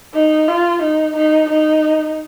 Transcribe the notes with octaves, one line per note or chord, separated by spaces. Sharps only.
D#4
F4
D#4
D#4
D#4